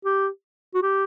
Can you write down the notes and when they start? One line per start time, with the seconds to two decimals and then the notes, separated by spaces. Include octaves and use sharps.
0.05 G4
0.74 F#4
0.82 G4